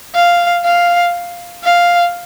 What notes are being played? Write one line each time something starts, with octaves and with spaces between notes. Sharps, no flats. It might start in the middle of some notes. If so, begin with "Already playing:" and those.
F5
F5
F5